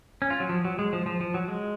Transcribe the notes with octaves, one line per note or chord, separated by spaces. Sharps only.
C#4
F4
F#3
F3
F#3
G#3
F3
F3
F3
F#3
G#3